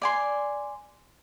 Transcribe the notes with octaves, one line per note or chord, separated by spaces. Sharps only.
D5 G#5 C6